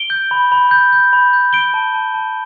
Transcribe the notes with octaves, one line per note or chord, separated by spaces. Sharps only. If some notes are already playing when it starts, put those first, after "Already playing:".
Already playing: D7 G7
G6
B5
B5
G6
G6
B5
G6
G6 D7 G7
A5
A5
A5